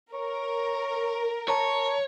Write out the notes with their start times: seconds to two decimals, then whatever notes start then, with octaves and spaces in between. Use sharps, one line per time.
0.14 A#4 C#5
1.48 C#5 A5 A#5 C#6